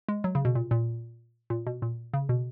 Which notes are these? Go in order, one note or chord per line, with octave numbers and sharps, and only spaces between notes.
G#3
F#3
C#3
B2
A#2
A#2
A#2
B2
A#2
C#3
B2